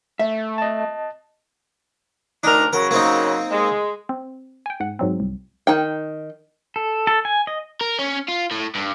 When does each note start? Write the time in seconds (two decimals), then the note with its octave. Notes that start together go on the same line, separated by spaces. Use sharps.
0.19 A3 E5
0.58 D#5 A5
2.44 D2 D4 D#4 A#4
2.73 C#3 F#3 A#4
2.91 A#3 C4 D#4
3.51 G#3
4.09 C4
4.66 G5 G#5
4.80 G#2 F#5
4.99 G#2 F#3 C4
5.20 C2
5.67 D#3 D#4 G5
6.76 A4
7.07 A4
7.25 G#5
7.47 D#5
7.81 A#4
7.99 C#4
8.28 F4
8.51 A2
8.75 G2